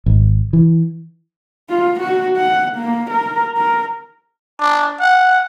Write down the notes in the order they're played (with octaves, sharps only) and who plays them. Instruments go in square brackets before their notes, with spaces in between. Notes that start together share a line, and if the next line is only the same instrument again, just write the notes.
[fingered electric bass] G#1
E3
[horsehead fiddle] F4
F#4
F#5
A#3
A#4
A#4
[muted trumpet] D4
F#5